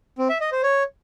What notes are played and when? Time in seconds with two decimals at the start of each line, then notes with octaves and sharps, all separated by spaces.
0.18 C4
0.29 E5
0.41 D#5
0.52 C5
0.63 C#5